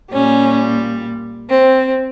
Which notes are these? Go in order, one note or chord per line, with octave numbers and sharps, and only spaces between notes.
A#2 G3 C#4
C4